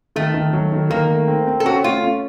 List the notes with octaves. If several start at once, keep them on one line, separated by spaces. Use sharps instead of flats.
D#3 A3
D#3
F#3
D#3
D#3 A#3
A3
C4
C4
A4
C#4 F#4
A3 F4
C#4